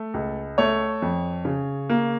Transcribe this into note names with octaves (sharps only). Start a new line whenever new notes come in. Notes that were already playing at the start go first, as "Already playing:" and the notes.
Already playing: A3
C#2
A3 C#5
F2
C#3
A#3